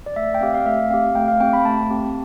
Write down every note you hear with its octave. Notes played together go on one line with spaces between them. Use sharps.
D5
A3 E5
G5
C4 G4 F5
F5
A3 E5
C4 G4 F5
A3 G5
F5
C4 G4 G5
B5
A3 A5
C4 G4